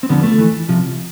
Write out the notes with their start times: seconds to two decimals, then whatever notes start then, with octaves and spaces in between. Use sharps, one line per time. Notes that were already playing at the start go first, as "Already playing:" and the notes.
0.03 C4
0.09 E2 D3 F3 B3
0.23 A3
0.39 F2 E3
0.68 C2 C3 F3